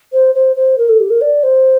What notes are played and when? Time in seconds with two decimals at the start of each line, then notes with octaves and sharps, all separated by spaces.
0.13 C5
0.35 C5
0.56 C5
0.78 A#4
0.89 A4
1.00 G4
1.10 A#4
1.21 D5
1.43 C5